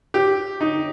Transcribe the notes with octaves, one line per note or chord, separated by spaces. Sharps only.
G4
D#4